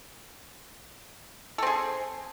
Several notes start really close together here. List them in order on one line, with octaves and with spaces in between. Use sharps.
A4 C4 G#4